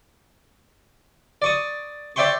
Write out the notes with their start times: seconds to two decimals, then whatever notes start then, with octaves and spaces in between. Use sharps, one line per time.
1.42 D5 C#6 D#6
2.16 C#5 D5 E5 G5 C6 C#6